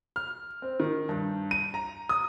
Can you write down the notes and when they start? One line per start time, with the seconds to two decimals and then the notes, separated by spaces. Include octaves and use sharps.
0.16 F6
0.62 C4
0.80 D#3
1.09 G2
1.51 D#7
1.74 A#5
2.09 D#6